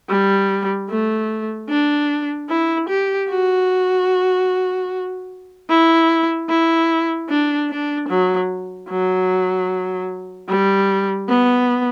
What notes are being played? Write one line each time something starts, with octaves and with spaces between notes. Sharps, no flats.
G3
A3
D4
E4
G4
F#4
E4
E4
D4
D4
F#3
F#3
G3
B3